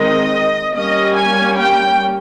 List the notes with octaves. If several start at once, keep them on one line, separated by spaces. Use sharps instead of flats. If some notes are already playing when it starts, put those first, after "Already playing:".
Already playing: D#3 G#3 C4 D#5
G3 A#3 C#4 D#5
G#5
G5